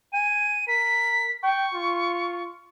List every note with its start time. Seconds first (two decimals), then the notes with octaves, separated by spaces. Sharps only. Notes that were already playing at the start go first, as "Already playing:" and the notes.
0.13 G#5 D#7
0.68 A#4 B6
1.43 G5 C#6
1.74 F4